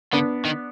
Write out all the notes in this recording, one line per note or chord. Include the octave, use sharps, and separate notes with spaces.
D3 B3 D4
D#3